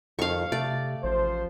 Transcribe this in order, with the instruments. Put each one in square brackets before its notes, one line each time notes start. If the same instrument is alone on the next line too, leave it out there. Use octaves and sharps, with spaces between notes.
[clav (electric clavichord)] F2 D#3 [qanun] F5 C#6
[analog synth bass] C3 [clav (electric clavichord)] A3 [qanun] D5
[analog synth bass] A1 [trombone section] F3 C5